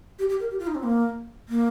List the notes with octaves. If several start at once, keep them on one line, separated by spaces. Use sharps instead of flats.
G4
G4
A#4
G4
F4
D#4
C4
A#3
A#3